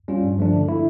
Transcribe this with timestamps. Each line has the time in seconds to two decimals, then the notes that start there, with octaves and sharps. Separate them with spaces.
0.08 G3 C#4 F4
0.24 G2
0.38 F3 A3 D4
0.53 D3
0.68 A3 E4